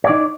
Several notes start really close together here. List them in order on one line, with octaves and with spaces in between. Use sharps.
C#5 D5 D#4